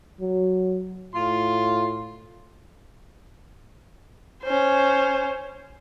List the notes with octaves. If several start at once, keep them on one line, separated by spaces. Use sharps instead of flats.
F#3
A2 F4 C6
C#4 C5